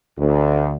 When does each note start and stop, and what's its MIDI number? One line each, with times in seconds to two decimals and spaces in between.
0.19 0.75 38